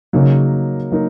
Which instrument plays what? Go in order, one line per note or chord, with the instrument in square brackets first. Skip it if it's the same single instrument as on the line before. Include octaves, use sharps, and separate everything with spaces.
[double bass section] C#3 [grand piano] F#3 A#3 D#4 A#4
[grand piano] F#3 A#3 D#4 A#4